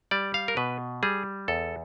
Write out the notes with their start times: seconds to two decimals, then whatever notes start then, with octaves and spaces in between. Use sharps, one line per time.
0.11 G3 D5
0.34 F5
0.48 A#4
0.57 B2 B4
1.03 G3 G#4
1.48 E2 A4